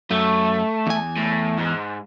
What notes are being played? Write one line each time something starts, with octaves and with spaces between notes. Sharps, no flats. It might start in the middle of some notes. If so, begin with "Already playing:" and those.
F#2 A3
E2 G#5
A2
G#2